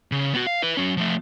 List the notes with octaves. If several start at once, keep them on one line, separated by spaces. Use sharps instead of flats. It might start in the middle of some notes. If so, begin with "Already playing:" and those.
C#3
B3 F#4
F5
E4 B4
F#3 C#4
F3 A3